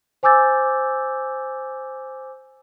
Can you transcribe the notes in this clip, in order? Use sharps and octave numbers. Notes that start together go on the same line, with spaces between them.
C5 G#5 D6 E6 G6 A6